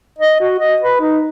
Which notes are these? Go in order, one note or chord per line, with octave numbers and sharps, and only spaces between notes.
D#5
F#4
D#5
B4
D#4